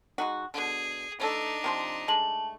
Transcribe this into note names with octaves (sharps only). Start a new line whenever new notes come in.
G#3 D#4 F#4
B2 D3 G#4
E3 A3 D4 D#4 A4
C3 F3 C6
G#3 A3 A5 F#7